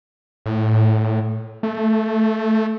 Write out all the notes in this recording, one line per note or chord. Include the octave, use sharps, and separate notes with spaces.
A2
A3